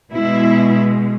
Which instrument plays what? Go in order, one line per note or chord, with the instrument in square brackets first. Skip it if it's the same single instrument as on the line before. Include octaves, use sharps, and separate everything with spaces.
[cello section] B2 G#3 E4